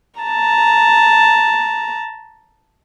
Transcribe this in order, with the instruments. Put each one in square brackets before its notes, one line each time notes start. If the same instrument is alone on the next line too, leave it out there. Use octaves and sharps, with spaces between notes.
[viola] A5 A#5